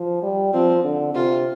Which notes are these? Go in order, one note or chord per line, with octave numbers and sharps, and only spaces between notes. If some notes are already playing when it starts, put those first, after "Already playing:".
Already playing: F3
G3
F3 C4
D3
C3 F4